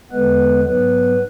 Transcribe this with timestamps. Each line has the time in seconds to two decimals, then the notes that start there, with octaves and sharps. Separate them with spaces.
0.11 E2 D3 G#3 B3 B4
0.64 G#2 F#3 B3 B4